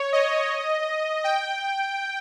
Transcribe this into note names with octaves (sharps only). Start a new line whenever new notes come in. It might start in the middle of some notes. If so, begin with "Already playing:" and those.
Already playing: C#5
D#5
G5